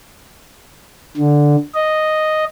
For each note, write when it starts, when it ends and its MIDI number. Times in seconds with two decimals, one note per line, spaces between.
1.17 1.56 50
1.75 2.45 75